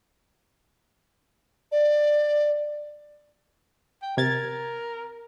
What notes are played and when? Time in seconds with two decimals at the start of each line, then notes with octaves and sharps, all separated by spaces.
1.72 D5
4.02 G5
4.17 C3 A#4 G#6 A6